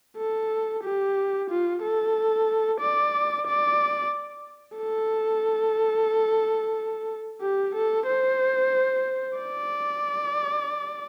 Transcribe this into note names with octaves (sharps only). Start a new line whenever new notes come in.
A4
G4
F4
A4
D5
D5
A4
G4
A4
C5
D5